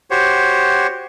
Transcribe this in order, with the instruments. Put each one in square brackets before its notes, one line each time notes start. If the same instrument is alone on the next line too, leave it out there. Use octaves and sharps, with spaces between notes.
[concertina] F#4 G4 C5 C#5